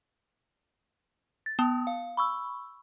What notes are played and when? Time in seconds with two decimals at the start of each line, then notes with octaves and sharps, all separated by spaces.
1.46 A6
1.59 B3 A5 D#6
1.87 F5
2.17 B5 C#6 E6